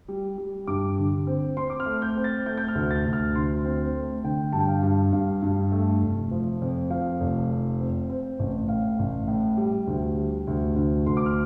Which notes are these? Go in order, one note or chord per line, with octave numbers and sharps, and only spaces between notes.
G3
G3
G2 D6
D3
C4
C4 C6
D6
F6
A3
G6
C4
A6
A3 G6
G6
F6
D2
A6
D2
F6
D2 C6
C4
A3
D3 G5
G2 A5
G5
F5
G2
G2 F5
G2
A3
F1
F3
F2
F3 F5
F1
F3
C4
C4
A1
A2 F5
A1
A2
G3
D2
G3
D2
D2
D2 C6
D6
F6